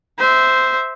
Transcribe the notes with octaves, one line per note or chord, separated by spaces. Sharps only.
C5 E5